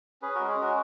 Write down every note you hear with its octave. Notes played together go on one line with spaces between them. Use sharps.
C#4 G#4 B4
G#3 F#4 A#4
G#4
C#4 F#4 A#4